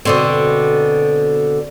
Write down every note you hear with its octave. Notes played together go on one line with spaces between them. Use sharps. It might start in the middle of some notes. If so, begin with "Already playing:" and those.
B2 D3 C4